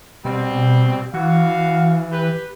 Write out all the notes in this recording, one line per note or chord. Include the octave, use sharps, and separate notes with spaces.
B2 G3 C4
E3 F#4 F5
G4 B4